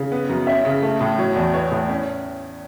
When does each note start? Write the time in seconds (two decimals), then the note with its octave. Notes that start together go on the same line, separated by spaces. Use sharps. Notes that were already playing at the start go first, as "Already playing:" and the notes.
Already playing: C#3
0.12 B3
0.29 F#2
0.47 C#4 E5
0.65 C#3
0.82 A3
1.01 A2
1.18 F#3 C#5
1.36 E2
1.54 B3 C#5
1.72 A2
1.90 C#4